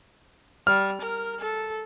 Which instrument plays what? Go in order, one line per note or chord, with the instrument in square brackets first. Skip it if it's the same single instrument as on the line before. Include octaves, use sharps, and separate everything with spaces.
[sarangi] G3 [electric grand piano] F6
[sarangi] A#4
A4